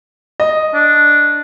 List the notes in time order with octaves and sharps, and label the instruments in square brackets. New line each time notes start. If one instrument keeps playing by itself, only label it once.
[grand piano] D#5
[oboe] D4